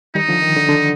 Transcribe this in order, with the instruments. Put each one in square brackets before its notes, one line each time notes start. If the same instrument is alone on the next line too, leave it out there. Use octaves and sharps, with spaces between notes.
[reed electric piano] D#3 G3 [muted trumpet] D#4
[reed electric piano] D3 F3
D#3
D3
D3